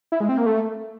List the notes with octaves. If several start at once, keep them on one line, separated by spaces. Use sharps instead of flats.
E4
G#3
C4
A#3
A3